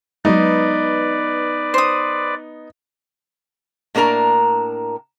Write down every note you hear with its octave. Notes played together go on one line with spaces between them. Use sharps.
F#3 G#3 B3 D#4 B4 D5
C5 D#6
A2 A#3 D4 A#4 A#5